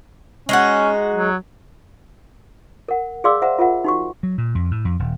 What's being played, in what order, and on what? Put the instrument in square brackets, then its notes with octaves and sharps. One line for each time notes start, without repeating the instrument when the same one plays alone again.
[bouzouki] G#3 D#4 F#4 [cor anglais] C#4
[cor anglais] F#3
[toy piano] A#4 F#5
G#4 D5 F5 C6 D6 E6
C5 E5 F#5 A#5
F4 A#4 E5 F#5
D#4 F#4 C#6
[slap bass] F#3
A#2
F2
A2
F2
D#1